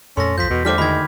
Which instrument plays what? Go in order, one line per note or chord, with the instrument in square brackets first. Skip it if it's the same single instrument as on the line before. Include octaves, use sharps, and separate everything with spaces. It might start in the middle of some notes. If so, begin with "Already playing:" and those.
[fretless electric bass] F2 A#2 A3 [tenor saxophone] C#4 [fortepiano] A4 [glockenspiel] C6 A#6
[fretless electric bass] B1 F2 [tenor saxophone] F3 [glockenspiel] G6 B6
[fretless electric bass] E2 [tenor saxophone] B2
[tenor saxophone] D3 [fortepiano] G3 A3 C5 [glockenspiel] D6 F6 B6
[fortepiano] D2 D#3 [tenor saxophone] G#3 [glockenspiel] B5 G#6